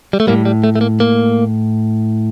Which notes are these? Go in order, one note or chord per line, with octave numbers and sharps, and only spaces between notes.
G3
A3
A2 G3 A#3
G3
A3
A3
A#3
A#3